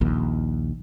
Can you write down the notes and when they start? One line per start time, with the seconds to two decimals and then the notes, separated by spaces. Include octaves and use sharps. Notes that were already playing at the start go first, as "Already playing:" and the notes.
0.01 A#1 D#2